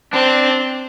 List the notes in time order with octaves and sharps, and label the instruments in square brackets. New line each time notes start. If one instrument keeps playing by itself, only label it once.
[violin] C4 [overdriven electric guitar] D4